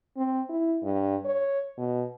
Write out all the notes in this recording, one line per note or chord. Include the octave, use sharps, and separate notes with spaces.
C4
E4
G2
C#5
B2